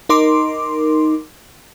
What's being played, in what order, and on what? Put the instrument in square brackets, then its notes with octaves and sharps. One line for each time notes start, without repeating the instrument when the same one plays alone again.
[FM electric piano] D#4 A#4 C6 D6